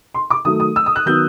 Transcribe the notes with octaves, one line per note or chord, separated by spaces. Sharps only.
C6
D6
D#3 F#3 A3 D#6
D#6
E6
D#6
F#6
D#3 F#3 B3 G6